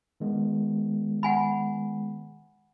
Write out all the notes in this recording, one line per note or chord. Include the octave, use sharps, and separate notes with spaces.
D#3 G#3 B3
F#5 G#5 B5